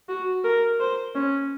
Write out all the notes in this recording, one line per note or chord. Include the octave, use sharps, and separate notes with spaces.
F#4
A#4
C5
C#4